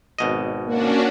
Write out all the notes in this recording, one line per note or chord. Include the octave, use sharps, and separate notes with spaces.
G#1 B2 D#5
A#3 C#4 D4 F#4